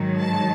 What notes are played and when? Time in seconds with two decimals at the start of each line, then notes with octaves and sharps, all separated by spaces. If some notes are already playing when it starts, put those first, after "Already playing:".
Already playing: G#2 D#3 F#3
0.19 A5